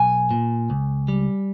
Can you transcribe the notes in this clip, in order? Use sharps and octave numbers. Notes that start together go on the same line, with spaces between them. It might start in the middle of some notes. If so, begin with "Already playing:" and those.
Already playing: B1 G#5
A#2
C#2
G3